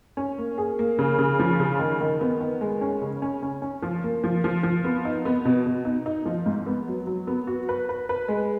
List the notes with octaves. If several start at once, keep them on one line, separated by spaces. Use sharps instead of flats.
C#4
A#3
G#4
A#3
C#3
C#3
F3
C#3
D#3
D#3
B3
D#3
G#3
C#4
C#3
C#4
C#4
C#4
F3
A#3
F3
F3
F3
B3
D#4
B3
B2
B2
D#4
D#4
F3
G#2
B3
F#3
F#3
B3
F#4
B4
B4
B4
G#3